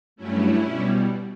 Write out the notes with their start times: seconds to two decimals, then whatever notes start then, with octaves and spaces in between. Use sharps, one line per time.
0.16 G2 F#3 A3 C#4 E4
0.63 B2 G3